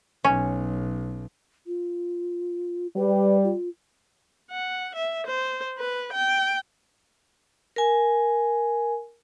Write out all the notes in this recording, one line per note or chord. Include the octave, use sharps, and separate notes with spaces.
B1 C#4
F4
G3 B4
F4
F#5
E5
C5
B4
G5
A#4 G#5